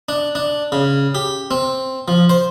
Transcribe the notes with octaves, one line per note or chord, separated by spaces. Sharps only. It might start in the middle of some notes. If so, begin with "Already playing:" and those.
D4
D4
C#3
G4
C4
F3
C5